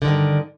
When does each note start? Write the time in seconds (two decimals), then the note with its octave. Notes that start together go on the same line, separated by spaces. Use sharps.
0.02 D3
0.05 D#3
0.08 G2